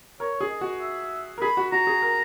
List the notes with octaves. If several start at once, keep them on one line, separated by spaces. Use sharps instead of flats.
A#4 C#5
G#4
D#5
F#4
E5
A#4
G#4 B5
F#4
F#4 A#5
G#4
A#4